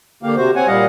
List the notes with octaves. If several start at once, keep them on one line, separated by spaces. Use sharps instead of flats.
D3 A#3 G4 F5
C3 F#4 C5
C4 C#5 F#5 G#5
A#2 G3 D#5 F5 F#5